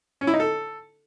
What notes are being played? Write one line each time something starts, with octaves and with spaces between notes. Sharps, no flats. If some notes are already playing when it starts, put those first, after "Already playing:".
C#4
E4
D#4
A4